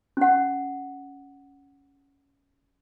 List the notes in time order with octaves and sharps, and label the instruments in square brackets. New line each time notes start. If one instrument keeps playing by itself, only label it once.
[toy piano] C#4 F#5